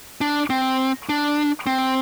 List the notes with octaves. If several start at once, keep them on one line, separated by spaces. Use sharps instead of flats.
D4
C4
D4
C4